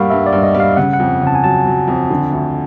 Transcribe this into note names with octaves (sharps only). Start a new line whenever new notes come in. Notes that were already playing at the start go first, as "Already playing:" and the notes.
Already playing: G2 G3 A#3 F5 F#5 B5 C#6
G2 E5
D5
G2
D#5
G3
F5
C#3 F#5
F#5
F2
C#3
A5
G#5
F#3 A5
F#3
F2
D3
D2